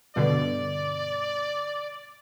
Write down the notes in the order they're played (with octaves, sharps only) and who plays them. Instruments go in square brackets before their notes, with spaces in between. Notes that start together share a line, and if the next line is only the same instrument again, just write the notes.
[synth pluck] G2 B2 D3 [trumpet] D5